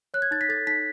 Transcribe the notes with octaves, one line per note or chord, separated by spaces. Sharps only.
C#5 F#6
G#6
D#4 A6
B6
A4 A6
D#4 B6